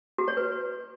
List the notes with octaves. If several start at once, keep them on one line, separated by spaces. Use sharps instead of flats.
F#4
C#5
B4